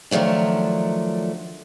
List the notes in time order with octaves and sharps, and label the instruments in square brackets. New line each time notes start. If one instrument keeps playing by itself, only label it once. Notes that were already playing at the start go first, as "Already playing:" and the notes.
[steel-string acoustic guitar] D#3 F3 F#3 A3 D4